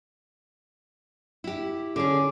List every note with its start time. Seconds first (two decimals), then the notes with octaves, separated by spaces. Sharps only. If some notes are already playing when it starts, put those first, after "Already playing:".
1.44 E4 G4
1.96 D3 C#4 G#4 D6